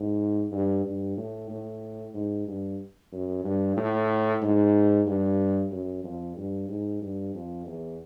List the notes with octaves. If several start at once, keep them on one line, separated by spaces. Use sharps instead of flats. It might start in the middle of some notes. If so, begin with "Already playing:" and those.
Already playing: G#2
G2
G2
A2
A2
G#2
G2
F#2
G2
A2
G#2
G2
F#2
F2
G2
G#2
G2
F2
E2